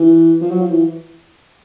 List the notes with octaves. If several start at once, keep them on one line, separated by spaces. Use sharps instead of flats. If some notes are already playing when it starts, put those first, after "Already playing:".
Already playing: E3
F3
F#3
F3
E3